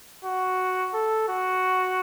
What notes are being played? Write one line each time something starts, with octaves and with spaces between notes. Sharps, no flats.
F#4
A4
F#4